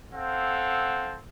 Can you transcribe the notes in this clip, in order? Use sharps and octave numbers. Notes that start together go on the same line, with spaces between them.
C4 A4 F5 F#5